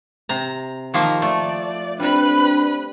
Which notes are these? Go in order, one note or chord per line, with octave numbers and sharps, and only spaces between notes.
C3 A#5
D#3 F3 A#3 D#4
A3 D5
G3 C4 D4 B4 B5